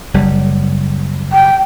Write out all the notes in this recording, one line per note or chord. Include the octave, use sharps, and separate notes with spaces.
F#1 G3
G5